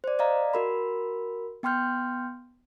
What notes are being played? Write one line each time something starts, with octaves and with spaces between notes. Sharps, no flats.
C5 D5
D5 D#5 F5 A#5
F#4 A#4 B5
B3 G5 C6 F6 G6